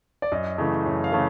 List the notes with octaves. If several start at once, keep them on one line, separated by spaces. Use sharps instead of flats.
D5
F#2 D#5
C#3 E3 A3
F#2
F5
C#3 E3 A3